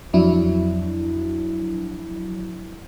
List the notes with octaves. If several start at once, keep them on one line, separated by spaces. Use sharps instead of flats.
F2 F#3 D4 E4